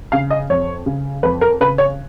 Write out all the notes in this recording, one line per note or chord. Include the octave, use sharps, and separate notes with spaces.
C#3 F5
D#5
F2 C#5
C#3
F2 B4
A#4
C#3 B4
C#5